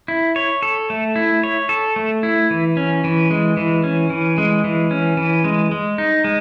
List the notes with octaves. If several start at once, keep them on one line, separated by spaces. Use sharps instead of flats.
E4
C#5
A4
A3
E4
C#5
A4
A3
E4
E3
C#4
E3
G#3
E3
C#4
E3
G#3
E3
C#4
E3
G#3
G#3
D#4
G#3